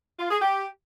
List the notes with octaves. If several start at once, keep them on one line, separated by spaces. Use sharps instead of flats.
F4
G#4
G4